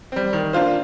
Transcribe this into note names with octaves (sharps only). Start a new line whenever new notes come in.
G3 C4
D#3
A#3 D4 F4 C5